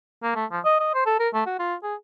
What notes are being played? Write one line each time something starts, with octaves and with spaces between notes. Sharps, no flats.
A#3
A3
F3
D#5
D#5
C5
A4
A#4
A3
F#4
F4
G#4